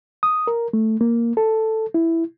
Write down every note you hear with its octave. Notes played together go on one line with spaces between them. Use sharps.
D#6
A#4
A3
A#3
A4
E4